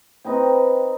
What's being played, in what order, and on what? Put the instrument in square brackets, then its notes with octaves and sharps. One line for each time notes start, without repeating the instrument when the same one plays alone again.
[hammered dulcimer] C4 D#4 B4 G5